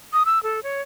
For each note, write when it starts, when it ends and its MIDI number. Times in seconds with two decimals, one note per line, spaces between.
0.13 0.23 87
0.26 0.42 88
0.43 0.63 69
0.63 0.82 73